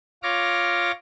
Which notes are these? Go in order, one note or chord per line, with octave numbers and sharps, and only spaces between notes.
F4 C#5 D6 F6 A#6